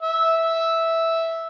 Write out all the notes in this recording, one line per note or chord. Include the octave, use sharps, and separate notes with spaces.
E5